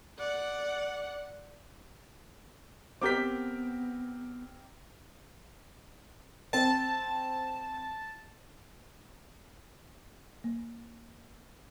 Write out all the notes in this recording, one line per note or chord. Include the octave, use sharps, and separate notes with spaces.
D5 F#5
B3 C4 G4 A#4 D6 G6 B6
C4 A5
A#3